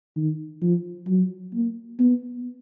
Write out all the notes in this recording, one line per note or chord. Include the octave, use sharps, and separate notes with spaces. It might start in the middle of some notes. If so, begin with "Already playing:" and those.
D#3
F3
F#3
A#3
B3